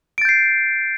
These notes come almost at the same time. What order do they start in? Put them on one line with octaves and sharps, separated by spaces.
D7 A6 G6 C7